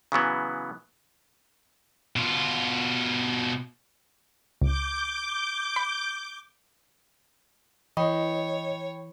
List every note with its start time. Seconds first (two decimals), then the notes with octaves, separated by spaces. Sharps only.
0.12 C#3 E3 F#3 B3
2.16 B2 F4
4.62 C#2 D6 G6
5.76 B5
7.97 E3 C#5 D#5 G5 B5 C#6